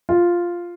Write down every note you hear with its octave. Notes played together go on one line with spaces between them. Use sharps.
F4